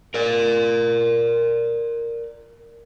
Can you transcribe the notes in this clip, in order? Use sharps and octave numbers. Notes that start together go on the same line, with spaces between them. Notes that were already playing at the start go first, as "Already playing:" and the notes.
A#4 D5